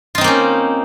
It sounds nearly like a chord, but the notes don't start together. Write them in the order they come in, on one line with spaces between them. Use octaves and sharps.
F4 D#4 C4 A#3 C#4